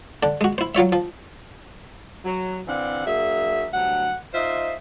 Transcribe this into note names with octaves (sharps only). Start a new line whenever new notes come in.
D3 D4
G#3 F#4
E4 C5
F#3 F4 C#5 E5
F3
F#3
D3 E3 C4 D5 F5 F#5
F#3 A#3 D4 G#4 E5
D2 G2 F#3 F#5
D#4 F4 C5 D#5 E5